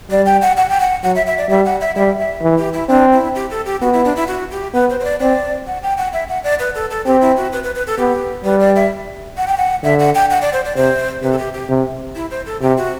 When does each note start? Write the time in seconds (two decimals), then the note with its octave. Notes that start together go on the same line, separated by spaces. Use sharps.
0.11 G3 D5
0.26 G5
0.42 F#5
0.57 F#5
0.70 G5
0.80 F#5
1.03 F#3 F#5
1.15 E5
1.27 E5
1.38 D5
1.50 G3 E5
1.65 F#5
1.81 E5
1.96 G3 E5
2.19 E5
2.42 E3
2.58 G4
2.73 E4
2.89 C4 D4
3.12 E4
3.35 G4
3.51 A4
3.66 G4
3.82 B3 F#4
3.93 E4
4.05 D4
4.16 E4
4.28 F#4
4.51 G4
4.74 B3 B4
4.90 C5
5.00 C5
5.05 D5
5.20 C4 D5
5.67 F#5
5.83 G5
5.97 F#5
6.13 E5
6.29 F#5
6.44 D5
6.59 B4
6.75 A4
6.91 A4
7.06 C4 G4
7.21 E4
7.37 F#4
7.53 B4
7.64 B4
7.75 B4
7.87 A4
7.98 B3 G4
8.44 G3 B4
8.60 D5
8.76 E5
9.37 F#5
9.48 G5
9.58 F#5
9.83 D3 E5
9.99 F#5
10.15 G5
10.30 F#5
10.42 D5
10.53 C5
10.65 D5
10.76 C3 C5
11.23 C3 B4
11.32 A4
11.38 G4
11.53 G4
11.69 C3
12.16 E4
12.31 C5
12.46 A4
12.62 C3 G4
12.77 F#4